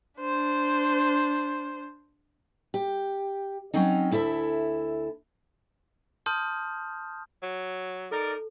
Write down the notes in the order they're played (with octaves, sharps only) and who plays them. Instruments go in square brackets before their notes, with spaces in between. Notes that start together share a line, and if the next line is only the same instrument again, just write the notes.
[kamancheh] D4 C5
[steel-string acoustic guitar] G4
F#3 C4 C#4 D#4
D2 E4 A4 E5
[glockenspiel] A5 C6 D#6 F6 G6
[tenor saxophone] F#3
[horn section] D#4 A#4 D5 [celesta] A4